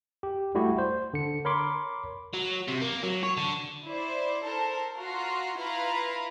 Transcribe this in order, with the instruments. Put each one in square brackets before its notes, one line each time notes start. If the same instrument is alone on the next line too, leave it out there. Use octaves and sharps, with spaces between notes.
[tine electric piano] G4
G3 A3 E4 F#4 G4
C5
D3 C#7
A#4 C#5 B5 C6 D6
[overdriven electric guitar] F#3
C3
A#3
F#3
C#5
D3
[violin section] E4 C5 D5
A4 A#4 C5
F4 F#4 A#5 C6
E4 F4 B4 A#5 B5